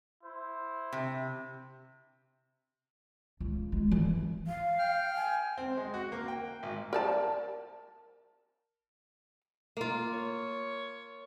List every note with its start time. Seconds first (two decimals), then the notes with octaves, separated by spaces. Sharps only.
0.23 E4 C5
0.93 C3
3.40 C#2
3.72 G#3
3.91 E3
4.47 F5
4.79 G5 F6
5.16 G#5
5.58 C4
5.77 G#3
5.94 F#4
6.12 A#3
6.28 G5
6.63 G#1
6.93 A#4 D5 A5
9.77 A#3 F4
10.13 C#5